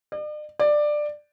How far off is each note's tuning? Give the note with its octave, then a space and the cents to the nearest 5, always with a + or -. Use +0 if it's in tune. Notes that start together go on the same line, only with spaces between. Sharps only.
D5 +45
D5 +15